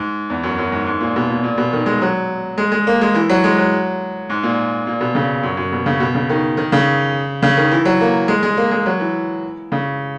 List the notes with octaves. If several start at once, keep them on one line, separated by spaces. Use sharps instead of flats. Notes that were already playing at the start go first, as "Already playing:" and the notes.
Already playing: G#2
E2
F#2
F#2
G#2
G#2
A#2
B2
A#2
A#2
B2
D#3
G#3
F#3
G#3
G#3
A#3
G#3
E3
F#3
G#3
F#3
G#2
A#2
A#2
B2
C#3
F#2
F#2
B2
C#3
B2
C#3
D#3
D#3
C#3
C#3
D#3
E3
F#3
A#3
G#3
G#3
A#3
G#3
F#3
E3
C#3